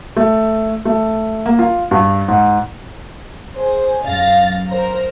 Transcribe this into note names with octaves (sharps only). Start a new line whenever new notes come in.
A3
A3
A#3
F4
G2
G#2
G#4 C5
F#2 F5 A6 A#6
A#4 C5 A#5